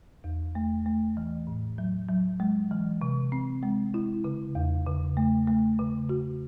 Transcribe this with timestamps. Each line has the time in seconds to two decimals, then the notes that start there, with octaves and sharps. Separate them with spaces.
0.24 E2
0.55 A3
0.86 A3
1.17 E3
1.47 A2
1.78 F#3
2.09 F#3
2.40 G#3
2.71 E3
3.02 C3
3.32 C4
3.63 G#3
3.94 E4
4.24 C#3
4.55 E2
4.86 C#3
5.17 A3
5.48 A3
5.79 C#3
6.09 F#4